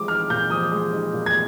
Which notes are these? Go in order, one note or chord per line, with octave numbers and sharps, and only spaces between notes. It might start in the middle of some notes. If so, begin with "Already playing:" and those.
Already playing: F3 G#3 D6
D#4 F6
A#2 G6
F3 D#6
G#3
D#4
A#2
G#6